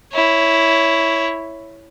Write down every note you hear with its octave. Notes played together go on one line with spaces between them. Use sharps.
E4 C#5